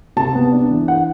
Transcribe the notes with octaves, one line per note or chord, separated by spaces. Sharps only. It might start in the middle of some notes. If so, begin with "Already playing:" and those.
C3 A5
B3
D4
E3
F#5